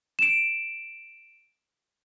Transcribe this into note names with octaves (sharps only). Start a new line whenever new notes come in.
D7 E7